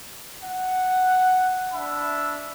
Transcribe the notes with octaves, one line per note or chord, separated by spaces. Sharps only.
F#5
D4 E5 B5